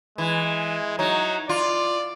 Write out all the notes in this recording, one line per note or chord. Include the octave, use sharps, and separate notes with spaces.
E3 G#3
F#3 D#4
F4 D5